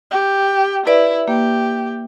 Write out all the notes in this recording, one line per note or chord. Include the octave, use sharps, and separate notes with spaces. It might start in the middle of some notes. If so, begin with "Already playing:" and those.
G4
E4 B4 D5
A#3 G4